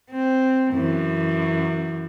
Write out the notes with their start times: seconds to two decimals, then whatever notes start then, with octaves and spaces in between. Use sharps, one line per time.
0.10 C4
0.72 F#2 E3